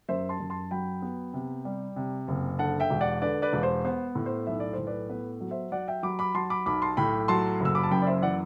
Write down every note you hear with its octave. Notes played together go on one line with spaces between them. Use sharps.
F#2 C5 E5
A5 C6
F#2
A5 C6
F#3 G5 B5
B3
C3
G3
C3
F#1
D3 F#5 A5
E5 G5
E1
D5 F#5
D3 B4 D5
B4 D5
E1
C5
B3 C5
A2
C5
B1 E5
D5
A2 C5
B4 D5
B3 B4
F#3
C5 E5
F#3 D5 F#5
E5 G5
F#3 B5 D6
B5 D6
F#3 A5 C6
B5 D6
B1 B5 D6
A5 C6
A2 G5 B5
F#3 A5 C6
F#1
E6
B5 D6
A5
F#2 G5 B5
D5
C5 E5
E3 D5 F#5